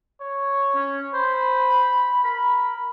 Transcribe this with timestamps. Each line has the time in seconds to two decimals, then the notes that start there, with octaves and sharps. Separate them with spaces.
0.21 C#5
0.75 C#4
1.14 C5 B5
2.24 A#4 B5